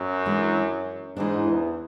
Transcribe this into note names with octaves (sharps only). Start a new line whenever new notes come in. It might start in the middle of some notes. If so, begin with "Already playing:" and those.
Already playing: F#2
E3 G#3 D4
G#2 E3 G#3 D4
E2